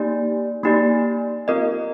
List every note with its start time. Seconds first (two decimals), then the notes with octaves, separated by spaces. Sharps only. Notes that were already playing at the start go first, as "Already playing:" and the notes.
Already playing: A#3 D#4 G4 D5
0.64 A#3 D#4 G4 D5
1.48 C4 F4 A#4 D#5